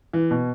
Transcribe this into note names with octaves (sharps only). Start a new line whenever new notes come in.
E3
B2